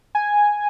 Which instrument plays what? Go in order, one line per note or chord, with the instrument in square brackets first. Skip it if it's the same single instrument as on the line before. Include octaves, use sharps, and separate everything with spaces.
[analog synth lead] G#5